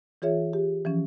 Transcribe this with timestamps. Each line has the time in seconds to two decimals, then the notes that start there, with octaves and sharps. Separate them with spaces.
0.22 E3 F4 G#4 C#5 E5
0.53 G4
0.85 E3 F3 C#4